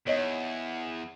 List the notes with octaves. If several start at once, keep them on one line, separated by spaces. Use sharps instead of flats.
E2 C#5 D#5